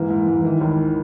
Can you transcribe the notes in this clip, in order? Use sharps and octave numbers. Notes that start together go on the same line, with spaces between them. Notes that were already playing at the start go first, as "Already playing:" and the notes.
Already playing: G#2 E3 A#3
G#2
G#2
D#3 E3
C#2